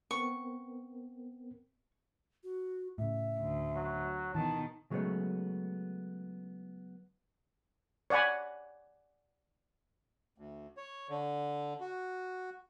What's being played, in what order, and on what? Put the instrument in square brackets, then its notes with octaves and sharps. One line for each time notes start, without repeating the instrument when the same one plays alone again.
[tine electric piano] B3 C4 A#4 [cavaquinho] C#6
[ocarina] F#4
[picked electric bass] A2 C#3 [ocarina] E5
[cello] D2
[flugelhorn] F#3
[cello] B2 D#3 [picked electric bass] E3 [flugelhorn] A5
[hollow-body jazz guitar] C#3 F#3 G#3 A3 B3 C#5
[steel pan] C#5 D5 F#5 G#5 B5
[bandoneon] D2
C#5
D3
F#4